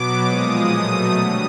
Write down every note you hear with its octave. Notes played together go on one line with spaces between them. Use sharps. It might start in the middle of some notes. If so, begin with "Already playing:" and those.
Already playing: B2 F#3 B3 D6
A#2 F3 G#3 D#6
B2 F#3 A3
D3 G3 D#6